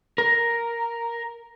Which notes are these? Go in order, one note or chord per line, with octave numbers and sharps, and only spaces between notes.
A#4